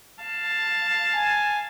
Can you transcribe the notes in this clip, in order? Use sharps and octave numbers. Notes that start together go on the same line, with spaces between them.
F5 A5
G#5